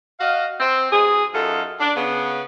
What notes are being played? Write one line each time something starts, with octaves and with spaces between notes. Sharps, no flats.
F#4 D#5 F5
C4
G#2 B2 G#4
F#2 D#4 F4 A4
D4
C#3 B3